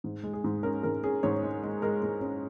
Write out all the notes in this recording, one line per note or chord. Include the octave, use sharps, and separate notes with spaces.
G#2
G#3
G#4
G#2
C#4 A#4
G#2 A#4
C#4 G#4
G#2 C#5
G#3
G#3
G#3 A#4
G#3
C#4